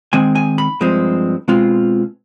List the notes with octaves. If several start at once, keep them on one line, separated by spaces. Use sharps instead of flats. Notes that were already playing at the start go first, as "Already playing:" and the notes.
D#3 G#3 C4 G#5
G#5
B5
G2 F3 G#3 C4
B2 G#3 C4 F4